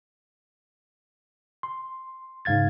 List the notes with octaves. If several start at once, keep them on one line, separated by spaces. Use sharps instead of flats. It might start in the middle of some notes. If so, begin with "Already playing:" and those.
C6
G#2 C#3 F5 G#6 A6